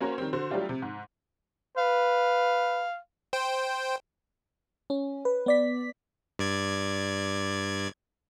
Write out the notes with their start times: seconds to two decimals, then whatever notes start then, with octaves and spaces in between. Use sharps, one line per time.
0.01 A#3 C#4 F#4 A#4 C5 C#5
0.18 D#3 G3 C4
0.33 D3 F#4 C5
0.50 F#3 G3 A3 D4 F4 G4
0.69 C3
0.82 G#2
1.78 B4 F5
3.33 C5 G5
4.90 C#4
5.25 B4
5.46 B3 D5 B6
6.39 G2 D5 G#6